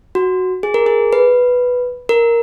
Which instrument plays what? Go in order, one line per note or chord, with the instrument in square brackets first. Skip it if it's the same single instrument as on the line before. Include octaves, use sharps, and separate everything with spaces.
[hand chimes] F#4
G#4
A#4
G#4
B4
A#4